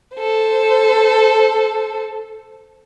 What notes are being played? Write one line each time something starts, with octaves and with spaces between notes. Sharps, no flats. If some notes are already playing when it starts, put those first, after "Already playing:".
A4 C5